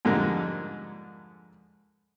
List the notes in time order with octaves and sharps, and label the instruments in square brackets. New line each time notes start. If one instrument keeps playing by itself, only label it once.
[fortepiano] F2 G#2 D3 G3 G#3 A#3